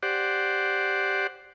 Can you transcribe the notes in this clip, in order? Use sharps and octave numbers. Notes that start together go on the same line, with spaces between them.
G4 C5 D5 F#5